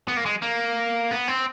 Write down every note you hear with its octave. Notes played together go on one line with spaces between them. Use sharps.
B3
A#3
G#3
A#3
B3
C4